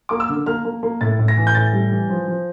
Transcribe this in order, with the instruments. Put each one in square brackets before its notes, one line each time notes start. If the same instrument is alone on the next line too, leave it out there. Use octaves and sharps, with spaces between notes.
[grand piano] A#3 D6
E6
D3
A#3 F6
A#3
A#3
A2 A6
A2
A#6
E3
G6
A2 A6
G3
E3
F3
F3